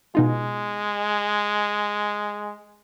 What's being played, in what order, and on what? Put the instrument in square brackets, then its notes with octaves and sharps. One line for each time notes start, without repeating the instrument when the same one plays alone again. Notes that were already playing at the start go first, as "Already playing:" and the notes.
[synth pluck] B2 D#4 F4 [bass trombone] G#3